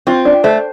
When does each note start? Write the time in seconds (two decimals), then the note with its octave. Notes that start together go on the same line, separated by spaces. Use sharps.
0.07 C4 F4
0.25 D4
0.44 A3 C5